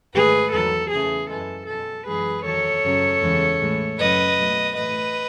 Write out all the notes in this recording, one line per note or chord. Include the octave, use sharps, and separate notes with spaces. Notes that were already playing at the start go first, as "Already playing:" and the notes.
G#2 D#3 A3 G#4 B4
E2 D#3 F#3 A4
E2 C#3 E3 A3 G#4
F#2 E3 G#3 A4
B2 G#3 A4
F#2 E3 G#3 G#4 B4
E2 D#3 F#3 A4 C#5
F#2 C#3 F#3
E2 C#3 E3 G#3
A2 E3 G#3
F#2 C#3 F#3 B4 D#5
B2 F#3 A3
A2 E3 A3 B4 D#5